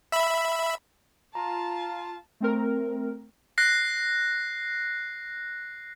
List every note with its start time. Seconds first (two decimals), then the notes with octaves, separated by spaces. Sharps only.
0.12 E5 B5
1.35 F4 A5 A#5
2.40 A3 C4 A#4
3.58 F#6 A#6 C7